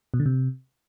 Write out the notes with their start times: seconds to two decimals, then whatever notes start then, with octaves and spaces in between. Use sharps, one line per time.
0.14 B2
0.20 D3
0.26 C3